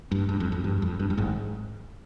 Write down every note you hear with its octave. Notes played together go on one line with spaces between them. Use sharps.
G2
G2
F2
F2
G2
F2
G2
G2
G#1 G#2